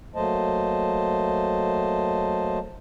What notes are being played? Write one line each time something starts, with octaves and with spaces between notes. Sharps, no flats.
F#3 A3 A#3 C5 D#5 A5